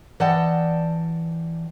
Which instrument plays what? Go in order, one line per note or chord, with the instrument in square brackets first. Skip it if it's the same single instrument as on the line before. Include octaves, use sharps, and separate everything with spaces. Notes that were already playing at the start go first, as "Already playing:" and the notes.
[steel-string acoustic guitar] E3 D5 D#5 F#5 G5 A5